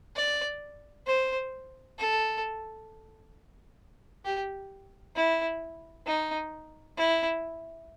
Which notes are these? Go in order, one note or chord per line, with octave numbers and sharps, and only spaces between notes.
D5
C5
A4
G4
E4
D#4
E4